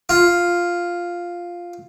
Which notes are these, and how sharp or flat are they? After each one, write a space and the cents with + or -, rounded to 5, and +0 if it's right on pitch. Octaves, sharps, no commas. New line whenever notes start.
F4 +0